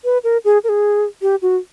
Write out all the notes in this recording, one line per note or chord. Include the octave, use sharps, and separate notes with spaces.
B4
A#4
G#4
A#4
G#4
G4
F#4